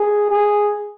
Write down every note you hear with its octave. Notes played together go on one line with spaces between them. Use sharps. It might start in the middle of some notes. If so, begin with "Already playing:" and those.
Already playing: G#4
G#4